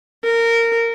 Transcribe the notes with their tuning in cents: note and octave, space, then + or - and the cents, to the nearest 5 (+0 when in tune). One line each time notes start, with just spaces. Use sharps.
A#4 -15